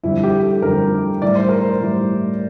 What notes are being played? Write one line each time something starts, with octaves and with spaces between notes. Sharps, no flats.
F2 D3 G3 E4
G4
A4
F2 D3 G3 A#4
A2 E3 G3 D5
C5
A#4
C5
A2 E3 G3